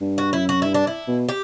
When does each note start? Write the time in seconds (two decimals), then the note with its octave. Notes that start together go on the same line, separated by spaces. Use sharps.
0.01 G2
0.18 F#4
0.33 F#2 E4
0.49 F#4
0.62 G2 E4
0.74 D4
0.87 E4
1.08 B2
1.29 G4